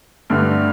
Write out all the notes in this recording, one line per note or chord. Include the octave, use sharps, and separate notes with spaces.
G2 D3 A3